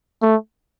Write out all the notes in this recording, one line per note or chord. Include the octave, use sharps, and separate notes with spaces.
A3